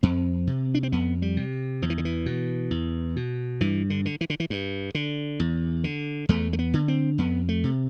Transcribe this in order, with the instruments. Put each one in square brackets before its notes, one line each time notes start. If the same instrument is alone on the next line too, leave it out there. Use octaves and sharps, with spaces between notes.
[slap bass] F2 C4
C3
D4
C4
F2 B3
G3
C3
E2 F3
E3
D3
E3
B2
E2
B2
G2 E3
D3
D3
E3
D3
E3
G2
D3
E2
D3
E2 A3
A3
B3
D3
C4
F2 B3
A3
C3